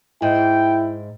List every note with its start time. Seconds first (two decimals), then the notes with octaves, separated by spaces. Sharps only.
0.22 G#2 E4 G5